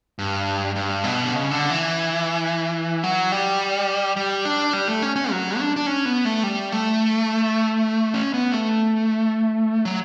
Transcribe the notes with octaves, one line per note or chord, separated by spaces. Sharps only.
G2
G2
B2
D3
C#3
D3
E3
F#3
G3
G3
D4
G3
A3
C#4
C#4
F#3
D4
D4
C#4
B3
A3
G3
A3
C#4
B3
A3
F#3